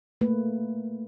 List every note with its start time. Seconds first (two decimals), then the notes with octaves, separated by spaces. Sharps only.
0.21 A3 A#3 B4